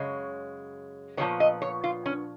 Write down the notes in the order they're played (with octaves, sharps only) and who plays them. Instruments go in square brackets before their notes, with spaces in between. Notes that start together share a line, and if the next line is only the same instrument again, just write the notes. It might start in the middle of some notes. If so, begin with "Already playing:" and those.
Already playing: [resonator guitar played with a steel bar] F#2 C#3 G#3 C#5
A#2 F3 G#3 B3 C#5
D#5
C#5
F4
C#4